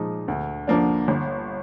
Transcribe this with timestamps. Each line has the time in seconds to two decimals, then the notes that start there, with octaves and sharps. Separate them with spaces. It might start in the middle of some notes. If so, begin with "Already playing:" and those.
Already playing: A#2 F3 G#3 D#4
0.28 D2
0.67 D3 F3 A#3 D4
1.08 G1